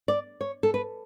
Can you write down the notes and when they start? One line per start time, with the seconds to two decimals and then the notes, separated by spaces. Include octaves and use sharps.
0.08 D5
0.41 C#5
0.63 A4
0.74 B4